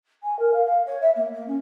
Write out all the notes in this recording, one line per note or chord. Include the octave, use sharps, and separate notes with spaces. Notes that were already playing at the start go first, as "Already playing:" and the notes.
G#5
A#4
F5
F5
C#5
E5
A#3
A#3
C#4